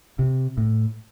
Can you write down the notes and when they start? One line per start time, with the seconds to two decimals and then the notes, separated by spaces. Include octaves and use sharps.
0.19 C3
0.57 A2